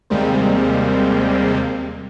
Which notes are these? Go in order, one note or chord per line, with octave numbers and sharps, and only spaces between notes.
D#2 C3 G3 G#3 A#3 C4